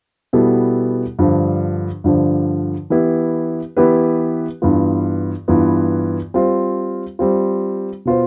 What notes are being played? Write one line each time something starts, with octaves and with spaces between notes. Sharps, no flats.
B2 G3 B3 E4 A4
G2 D3 F3
G2 D3 F3
E3 B3 E4 G4 B4
E3 B3 E4 G4 B4
G2 E3 B3 F4
G2 E3 B3 F4
G3 C4 F4
G3 C4 F4
B2 B3 F4 C5